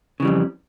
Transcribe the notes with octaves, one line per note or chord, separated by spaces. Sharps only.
F2 C#3 E3 G3